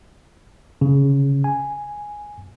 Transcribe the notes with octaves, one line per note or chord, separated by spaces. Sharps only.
C#3
G#5